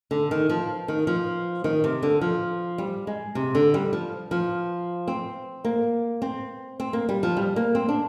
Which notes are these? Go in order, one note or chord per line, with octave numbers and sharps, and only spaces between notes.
D3
D#3
F3
D#3
F3
D#3
C3
D3
F3
G3
G#3
C3
D3
G3
F3
F3
C4
A#3
C4
C4
A#3
G3
F3
G3
A#3
C4
D4